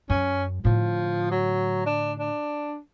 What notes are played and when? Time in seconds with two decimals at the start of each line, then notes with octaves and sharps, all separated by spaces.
0.10 F#2 C#4
0.65 A2 D3 F3
1.31 F#3
1.86 D4
2.19 D4